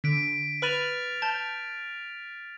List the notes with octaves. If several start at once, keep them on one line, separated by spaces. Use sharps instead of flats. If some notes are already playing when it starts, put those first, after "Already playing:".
D3 B6 D7
B4 B5 F6 A6 D#7 F7
A5 G6